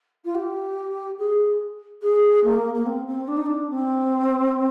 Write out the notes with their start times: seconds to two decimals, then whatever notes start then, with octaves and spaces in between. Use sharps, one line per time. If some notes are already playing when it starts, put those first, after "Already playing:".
0.24 F4
0.34 G4
1.18 G#4
2.02 G#4
2.44 A#3
2.73 A#3
2.86 C4
3.07 C4
3.27 D4
3.37 D#4
3.46 D4
3.70 C4